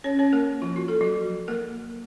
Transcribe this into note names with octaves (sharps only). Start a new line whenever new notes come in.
C#4 C#5
C#4 C#5
A#3 A#4
F3 F4
F#4
A4
F#3 F#4
A#3 A#4